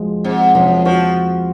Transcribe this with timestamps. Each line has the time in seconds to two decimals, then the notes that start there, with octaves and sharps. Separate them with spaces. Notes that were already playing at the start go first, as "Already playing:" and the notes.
Already playing: F3 G#3 F#4
0.24 G#2 C4
0.55 F#2 F3
0.85 F3 F#4